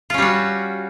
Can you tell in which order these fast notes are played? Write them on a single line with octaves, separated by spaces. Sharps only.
F4 C#4 G3 F#4